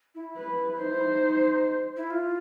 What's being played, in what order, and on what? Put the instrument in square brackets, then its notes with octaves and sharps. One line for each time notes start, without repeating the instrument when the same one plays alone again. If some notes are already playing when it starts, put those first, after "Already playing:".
[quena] E4
[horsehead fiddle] B4
[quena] D#4 [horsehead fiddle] C5
[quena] E4
D#4
E4
F4